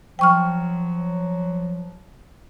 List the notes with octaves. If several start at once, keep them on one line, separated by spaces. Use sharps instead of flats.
F3 F#3 G5 C#6 F6